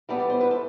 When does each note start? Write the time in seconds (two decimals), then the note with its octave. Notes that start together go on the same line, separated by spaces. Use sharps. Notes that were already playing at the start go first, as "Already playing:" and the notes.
0.09 E3 G3 B3 A4
0.20 D5
0.30 C5
0.41 B4
0.51 A4